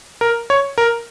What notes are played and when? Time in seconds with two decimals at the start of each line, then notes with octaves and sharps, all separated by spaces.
0.21 A#4
0.50 C#5
0.78 A#4